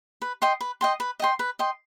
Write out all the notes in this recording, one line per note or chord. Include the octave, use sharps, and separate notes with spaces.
B4
D#5 G5 C6
B4
D#5 G5 C6
B4
D#5 G5 C6
B4
D#5 G5 C6